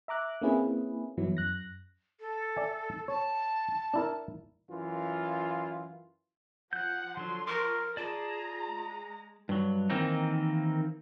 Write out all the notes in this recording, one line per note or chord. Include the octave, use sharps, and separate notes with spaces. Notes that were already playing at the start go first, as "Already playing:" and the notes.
E5 A#5 D6 F#6
A#3 C4 C#4 E4 G#4 B4
G2 E3 F#3 B3 E4
F#2 F#6 A#6
A4
D5 E5 G#5
C#5 A5
D4 E4 A#4
F#2 E3 F4
F3 F#5 F#6 G6
D3 F3 F#3 C6
F3 A#4 A#5 C#6 D6
F4 G#4 D5 A5 A#5 D6
G#3
G2 F#3
D#3 E3 A#3 C4 D#4